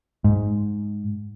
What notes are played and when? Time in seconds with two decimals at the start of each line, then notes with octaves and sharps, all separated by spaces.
0.24 G#2